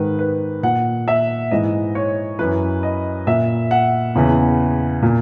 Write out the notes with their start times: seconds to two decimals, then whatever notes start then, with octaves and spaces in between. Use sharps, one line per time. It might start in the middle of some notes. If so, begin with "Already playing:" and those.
Already playing: G#2 D#3 B4
0.19 B4
0.63 A#2 F#5
1.08 E5
1.51 G#2 E3 D#5
1.95 C#5
2.39 F#2 E3 B4
2.83 D#5
3.27 A#2 E5
3.71 F#5
4.15 E2 C#3 E3
5.02 A#2